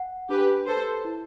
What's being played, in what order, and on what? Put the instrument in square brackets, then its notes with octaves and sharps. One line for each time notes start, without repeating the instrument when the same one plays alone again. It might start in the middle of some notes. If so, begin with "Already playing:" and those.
Already playing: [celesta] F#5
[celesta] D4 [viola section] G4 B4
[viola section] A4 C5 [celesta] B4
[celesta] E4